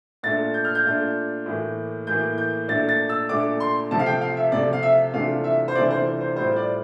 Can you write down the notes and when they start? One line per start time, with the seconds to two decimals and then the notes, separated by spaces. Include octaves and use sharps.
0.23 A#2 A3 D4 F4 A6
0.54 G6
0.65 F6
0.75 G6
0.85 A#2 A3 D4 F4
1.46 A2 E3 A#3
2.07 A2 E3 A#3 G6
2.38 G6
2.68 A#2 A3 D4 A6
2.89 A6
3.09 E6
3.29 A#2 A3 D4 D6
3.60 C6
3.91 C3 F3 A3 A5
3.99 F5
4.06 G5
4.21 F5
4.37 E5
4.52 C3 F3 A3 D5
4.73 F5
4.83 E5
5.13 C3 E3 A3 D4 F4 F5
5.44 E5
5.68 C5
5.75 C3 E3 A3 D4 F4 D5
5.91 C5
6.21 C5
6.36 A2 G3 C4 F4 C5
6.56 D5